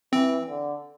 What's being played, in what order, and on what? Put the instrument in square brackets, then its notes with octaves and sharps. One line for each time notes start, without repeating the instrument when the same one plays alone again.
[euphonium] E3 [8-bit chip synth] C4
[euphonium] D3